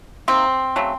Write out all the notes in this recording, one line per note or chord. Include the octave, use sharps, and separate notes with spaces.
C3 D#3 A#3 C4
C#3 F#3 A3